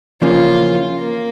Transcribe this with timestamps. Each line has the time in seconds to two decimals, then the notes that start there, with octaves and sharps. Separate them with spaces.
0.22 E2 C#3 F3 A#3 C#4 F4
0.99 A#3